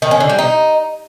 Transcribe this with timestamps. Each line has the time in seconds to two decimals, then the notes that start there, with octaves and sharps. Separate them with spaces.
0.02 D#3
0.11 C#4
0.20 D3
0.29 G3
0.39 D#4